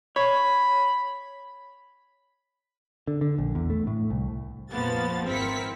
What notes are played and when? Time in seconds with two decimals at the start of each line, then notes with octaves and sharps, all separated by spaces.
0.16 C#5 B5
3.07 D3
3.21 D3
3.38 A#1
3.55 E2
3.70 A3
3.87 A2
4.10 C2
4.71 A#1 F2 F3 A#3 B3 A6
5.27 G#1 C4 E4 A#4 B6 C#7